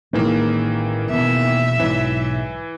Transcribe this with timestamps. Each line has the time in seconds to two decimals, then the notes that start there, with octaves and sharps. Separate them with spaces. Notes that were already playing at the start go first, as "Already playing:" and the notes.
0.13 A1 A2 D#3 E3 G#3 A#3
1.11 E1 B2 E5
1.80 B1 G#2 E3 F#3